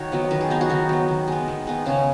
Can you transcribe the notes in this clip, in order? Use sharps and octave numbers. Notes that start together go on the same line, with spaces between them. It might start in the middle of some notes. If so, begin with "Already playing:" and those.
Already playing: D#3 D#4 F#4 C#5
F#3 B3
D#3 B4
G#4
F#3 B3 D#4
F#4
D#3 D#4
F#3 B3
D#3
G#3 B3
D#3
G#3 B3
C#3 C#4